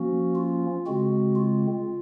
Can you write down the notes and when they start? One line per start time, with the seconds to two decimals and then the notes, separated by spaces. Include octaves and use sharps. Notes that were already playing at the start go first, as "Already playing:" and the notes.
Already playing: F3 A#3 C#4 F#4
0.36 F4
0.86 C#3 G#3 C4 F#4
1.36 F4